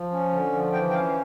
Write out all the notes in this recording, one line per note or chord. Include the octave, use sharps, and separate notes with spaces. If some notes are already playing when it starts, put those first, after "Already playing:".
Already playing: F3
C#4
D3
F3
E3 G5
G5
C#4 F5